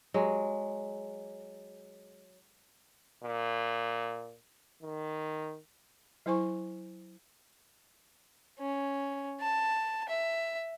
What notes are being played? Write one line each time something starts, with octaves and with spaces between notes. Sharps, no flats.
F#3 G#3
A#2
D#3
F#3 E4 C5 G#5 C#6
C#4
A5
E5